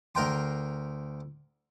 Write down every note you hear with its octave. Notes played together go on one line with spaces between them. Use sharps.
D2 A#4 G5 C6